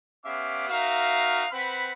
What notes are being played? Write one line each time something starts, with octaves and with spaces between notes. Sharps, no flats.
B3 C#4 G4 E5 F5 D6
D#4 F#4 A#4 E5 F5
C4 B4 F#5 B5